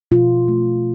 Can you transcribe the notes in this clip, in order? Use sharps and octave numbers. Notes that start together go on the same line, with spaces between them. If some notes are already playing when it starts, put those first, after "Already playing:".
B2 F4
A3